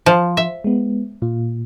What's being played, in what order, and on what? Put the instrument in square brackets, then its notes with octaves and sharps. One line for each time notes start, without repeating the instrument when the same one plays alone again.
[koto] F3
E5
[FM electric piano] G#3 B3
A#2 F4